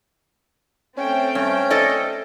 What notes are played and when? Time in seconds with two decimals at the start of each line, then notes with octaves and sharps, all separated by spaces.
0.97 A3 C4 C#4 G5
1.35 G2 C#4
1.70 A4 D5 D#5